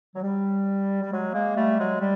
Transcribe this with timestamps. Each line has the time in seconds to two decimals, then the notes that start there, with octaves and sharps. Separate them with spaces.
0.15 F#3
0.23 G3
1.02 G3
1.11 F#3 G#3
1.33 G#3 A#3
1.56 G3 A3
1.78 F#3 G#3
2.00 G3